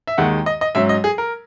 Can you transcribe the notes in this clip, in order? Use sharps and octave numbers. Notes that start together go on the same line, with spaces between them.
E5
D#2 D#3 G#3 F#5
D#5
D#5
G#2 F#3 C#4 E5
D#5
G#4
A#4